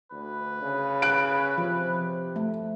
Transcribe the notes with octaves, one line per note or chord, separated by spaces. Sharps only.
D2 B4
C#3
F#6 D7
C3 F3
A3